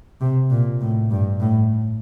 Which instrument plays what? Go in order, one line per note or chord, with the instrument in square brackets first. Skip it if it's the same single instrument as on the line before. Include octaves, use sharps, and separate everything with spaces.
[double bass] C3
A#2
A2
G2
A2